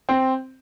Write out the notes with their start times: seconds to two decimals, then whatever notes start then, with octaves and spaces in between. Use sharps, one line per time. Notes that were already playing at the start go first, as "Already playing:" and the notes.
0.09 C4